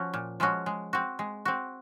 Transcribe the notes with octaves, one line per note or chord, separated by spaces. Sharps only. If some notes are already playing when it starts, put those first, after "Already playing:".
Already playing: F3 C#4 F#4
A#2
F3 G#3 C#4 F#4
G#3
C4 F#4
G#3
C4 F#4